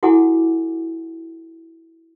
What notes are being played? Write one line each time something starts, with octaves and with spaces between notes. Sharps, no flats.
E4 F#4 A4 F#5 G#5 D6